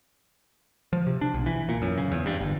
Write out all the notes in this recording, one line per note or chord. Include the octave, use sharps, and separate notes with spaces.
F3
C3
D4
B1
E3
A#2
F#2
C#3
E2
G2
G1